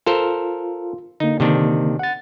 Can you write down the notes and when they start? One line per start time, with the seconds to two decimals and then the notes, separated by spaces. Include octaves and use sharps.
0.06 F4 A4 A#4 C5
1.20 D3 A#3 D#4
1.40 C3 D#3 D4
1.99 F#5 A6